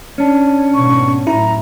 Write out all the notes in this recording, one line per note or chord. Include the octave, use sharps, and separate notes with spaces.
C#4 D4
D#2 G#2 B2 C#6
F#2 A2 E4 A#5